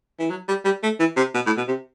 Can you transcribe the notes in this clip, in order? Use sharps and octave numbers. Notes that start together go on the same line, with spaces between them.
E3
F#3
G3
G3
A3
E3
C3
B2
A2
B2
C3